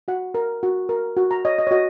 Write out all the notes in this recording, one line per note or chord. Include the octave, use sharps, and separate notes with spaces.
F#4 F#5
A#4
F#4
A#4
F#4
A#5
C#5 D#5
D#5
C#5
F#4 D#5